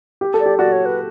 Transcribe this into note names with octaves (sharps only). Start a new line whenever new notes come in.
G4
A4
D5
G4
F#4 D5
C#5
B4